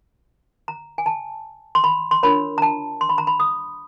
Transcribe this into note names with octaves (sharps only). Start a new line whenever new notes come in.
A#5
G#5
A5
C6
B5
C6
D4 F4 A#4 C#5 B5
A#5
A5
C6
B5
A#5
B5
D#6